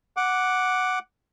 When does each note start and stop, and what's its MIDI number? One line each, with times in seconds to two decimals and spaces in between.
0.17 0.99 78
0.17 0.99 86